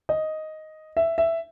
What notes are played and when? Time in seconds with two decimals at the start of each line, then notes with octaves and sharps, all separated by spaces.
0.09 D#5
0.97 E5
1.18 E5